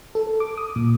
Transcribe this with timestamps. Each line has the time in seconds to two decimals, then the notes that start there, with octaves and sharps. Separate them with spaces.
0.15 A4
0.40 D6
0.58 D#6
0.76 A#2